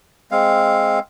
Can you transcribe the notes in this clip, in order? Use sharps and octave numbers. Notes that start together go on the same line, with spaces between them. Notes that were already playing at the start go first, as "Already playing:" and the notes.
G#3 C4 F5